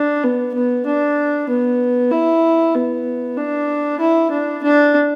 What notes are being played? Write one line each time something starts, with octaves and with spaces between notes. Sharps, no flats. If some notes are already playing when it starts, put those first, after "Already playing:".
Already playing: D4
B3
B3
D4
B3
E4
B3
D4
E4
D4
D4